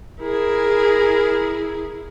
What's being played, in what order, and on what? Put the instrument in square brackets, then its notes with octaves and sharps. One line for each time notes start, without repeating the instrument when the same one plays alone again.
[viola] E4 G#4 [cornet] A#4